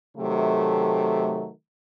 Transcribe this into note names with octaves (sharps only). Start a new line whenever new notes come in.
C3 D#3 F#3 A3